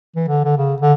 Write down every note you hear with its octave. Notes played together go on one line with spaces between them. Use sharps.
E3
D3
D3
C#3
D3